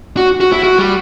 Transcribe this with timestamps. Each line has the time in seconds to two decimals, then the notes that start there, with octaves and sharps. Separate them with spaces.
0.17 F#4
0.40 F#4
0.52 E4
0.63 F#4
0.79 G3